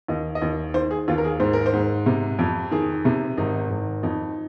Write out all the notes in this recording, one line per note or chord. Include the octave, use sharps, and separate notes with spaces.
D#2 D#5
D#5
D#2
D#3 C5
G#4
D#2 F4
A#4
G#4
G#2 C5
A#4
C5
G#2
C3
F2
D#3 G#4
C3
G#1 D#4
G#1
F2 D#4